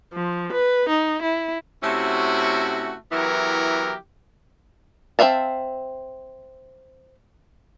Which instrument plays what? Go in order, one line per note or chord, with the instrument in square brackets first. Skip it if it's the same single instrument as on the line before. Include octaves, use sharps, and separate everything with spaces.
[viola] F3
B4
D#4
E4
[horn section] C3 A3 C#4 E4 F#4
E3 F#3 B3 E4 G4 A#4
[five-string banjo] C4 C5 E5 F5 A5